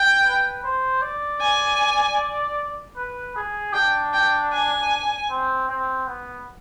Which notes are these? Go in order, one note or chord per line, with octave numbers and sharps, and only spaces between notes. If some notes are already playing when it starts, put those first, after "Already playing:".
Already playing: G5
B4
C5
D5
G#5
B4
G#4
D4 G5
G5
G#5
C4
C4
B3